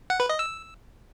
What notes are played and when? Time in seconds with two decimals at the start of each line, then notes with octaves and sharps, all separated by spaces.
0.10 F#5
0.20 B4
0.29 D#5
0.39 E6